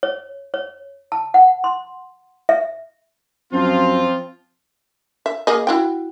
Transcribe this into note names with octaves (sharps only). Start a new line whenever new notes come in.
C#5
C#5
A5
F#5
C6
E5
F#2 F3 C4 F4
E5
A#3 G#4 D#5
E4 F#4 G5